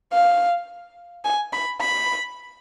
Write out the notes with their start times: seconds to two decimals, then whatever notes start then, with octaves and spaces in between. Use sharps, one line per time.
0.12 F5
1.25 G#5
1.53 B5
1.81 B5